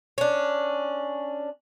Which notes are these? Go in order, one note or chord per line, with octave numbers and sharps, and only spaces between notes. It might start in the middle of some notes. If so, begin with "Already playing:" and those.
C#4 D4